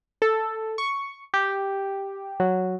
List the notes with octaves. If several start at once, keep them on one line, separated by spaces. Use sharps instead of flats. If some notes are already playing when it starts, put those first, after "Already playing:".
A4
C#6
G4
F#3